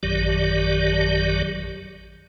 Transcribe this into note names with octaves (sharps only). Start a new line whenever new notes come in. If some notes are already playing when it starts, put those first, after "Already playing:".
A1 F#2 D#3 F#3 G4 D5